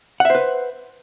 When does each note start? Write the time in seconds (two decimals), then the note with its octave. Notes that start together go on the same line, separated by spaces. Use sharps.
0.20 F#5
0.25 E5
0.30 C5
0.35 B4